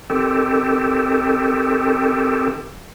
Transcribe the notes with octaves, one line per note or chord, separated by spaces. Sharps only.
D#3 C4 G4 A4